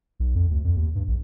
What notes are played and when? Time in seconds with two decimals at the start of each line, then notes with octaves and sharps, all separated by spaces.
0.20 B1
0.35 F2
0.50 D2
0.64 F2
0.76 D#2
0.95 G2
1.08 A#1